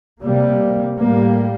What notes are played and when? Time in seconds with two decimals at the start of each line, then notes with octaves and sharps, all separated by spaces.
0.22 C3 G3 A#3
0.97 A2 G3 A#3